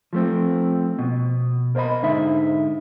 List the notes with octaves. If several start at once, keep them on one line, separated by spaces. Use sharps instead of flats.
F3 A3 C4
B2
A#4 C5 C#5 D#5 B5
G#2 D3 D#4 E5